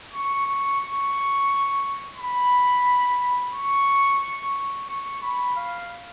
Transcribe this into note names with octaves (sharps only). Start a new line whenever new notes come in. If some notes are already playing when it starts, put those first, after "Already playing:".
C#6
C#6
C#6
B5
C#6
C#6
B5
F5